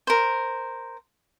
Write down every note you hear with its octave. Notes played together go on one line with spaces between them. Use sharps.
A#4 C5